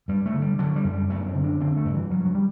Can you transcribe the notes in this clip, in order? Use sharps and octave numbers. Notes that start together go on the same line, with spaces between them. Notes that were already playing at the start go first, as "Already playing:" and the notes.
G2 G3
A3
D3
G3
D3 F#3
G3
F#2
G3
F#2 A3
D4
C4
D3
D4
D3 C4
A3
G2 D3
E3
G2 F#3
F#3
G3